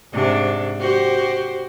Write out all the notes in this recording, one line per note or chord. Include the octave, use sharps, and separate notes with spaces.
G#2 C3 D4
F#4 G4 C5